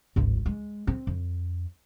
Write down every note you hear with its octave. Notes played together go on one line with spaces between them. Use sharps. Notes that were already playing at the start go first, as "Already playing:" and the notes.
D1 G#1
G#3
C4
F2